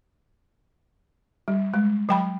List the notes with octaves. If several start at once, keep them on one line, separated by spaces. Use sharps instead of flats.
G3
G#3
F#3 G5 B5